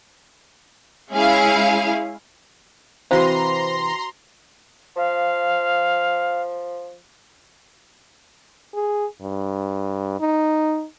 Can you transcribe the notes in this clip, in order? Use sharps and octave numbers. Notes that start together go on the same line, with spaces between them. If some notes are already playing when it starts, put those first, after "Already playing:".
G#3 C#4 E4 G#4 F5
C3 E3 C4 F#4 C5 F5 A#5 C6
F3 F5
G#4
G2
D#4